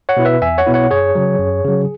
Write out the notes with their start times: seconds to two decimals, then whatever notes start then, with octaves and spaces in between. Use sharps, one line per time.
0.09 C#5 F#5
0.17 B2 B3 E4
0.25 B4 E5
0.42 E2 E5 G#5
0.58 C#5 F#5
0.67 B2 B3 E4
0.74 C#5 F#5
0.91 F#2 G#4 C#5
1.15 C#3 F#3
1.39 F#2
1.64 C#3 F#3